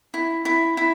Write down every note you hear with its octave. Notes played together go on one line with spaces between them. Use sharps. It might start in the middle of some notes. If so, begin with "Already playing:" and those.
E4
E4
E4